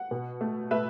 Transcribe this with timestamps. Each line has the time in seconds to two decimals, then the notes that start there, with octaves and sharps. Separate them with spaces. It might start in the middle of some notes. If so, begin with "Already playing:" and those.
Already playing: F#5
0.11 B2
0.41 A3
0.71 A3 B4 E5